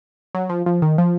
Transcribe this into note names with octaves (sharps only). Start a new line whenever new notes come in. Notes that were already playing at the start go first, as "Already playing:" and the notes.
F#3
F3
F3
D#3
F3